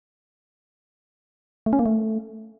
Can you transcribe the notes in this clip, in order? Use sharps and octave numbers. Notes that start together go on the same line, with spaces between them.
A3
C#4
A#3
A3